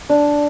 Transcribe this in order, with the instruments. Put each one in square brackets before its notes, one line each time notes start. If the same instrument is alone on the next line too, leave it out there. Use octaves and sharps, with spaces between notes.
[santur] D4